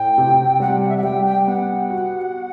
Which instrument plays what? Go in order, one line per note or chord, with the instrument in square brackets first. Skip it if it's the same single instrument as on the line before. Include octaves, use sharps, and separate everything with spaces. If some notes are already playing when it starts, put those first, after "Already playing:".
Already playing: [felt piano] A2 [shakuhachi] G5
[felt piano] C3
[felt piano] G3 [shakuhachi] F#5
[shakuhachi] F#5
E5
F#5
[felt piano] G3 [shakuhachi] G5
[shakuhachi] G5
[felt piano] B3 [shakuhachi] F#5
[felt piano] F#4